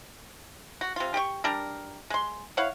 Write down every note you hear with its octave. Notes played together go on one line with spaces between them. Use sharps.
F#4
C3 F4
G4 G5 C#6
G3 D4 A#4
G#3 C6
E4 C#5 F5 F#5